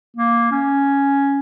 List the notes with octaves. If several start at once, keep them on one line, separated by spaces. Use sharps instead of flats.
A#3
C#4